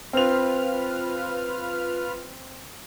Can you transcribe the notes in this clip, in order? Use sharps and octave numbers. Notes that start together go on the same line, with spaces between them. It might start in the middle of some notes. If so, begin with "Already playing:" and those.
C4 F4 B4 F6 F7